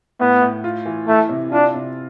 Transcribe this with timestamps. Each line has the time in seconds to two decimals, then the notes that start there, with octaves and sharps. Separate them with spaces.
0.20 A2 B3
0.41 A2
0.64 F4
0.85 E3
1.07 A3 E4
1.29 C3
1.52 D4 F4
1.74 C3